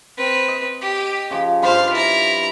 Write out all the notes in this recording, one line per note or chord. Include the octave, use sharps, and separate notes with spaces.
C4 B4
D#5
G4
C#3 F3
G2 F4 C5 F5 B5
E4 A#5